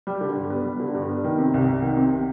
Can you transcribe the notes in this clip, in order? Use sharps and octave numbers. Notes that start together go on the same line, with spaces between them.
G3
D3
G2
B3
G3
D3
G2
B3
D#3
C3
C2
C2
D#3
C3